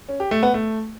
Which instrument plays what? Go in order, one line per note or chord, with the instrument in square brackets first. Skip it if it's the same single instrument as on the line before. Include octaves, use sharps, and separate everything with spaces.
[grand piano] C#4
G4
A3
B3
A3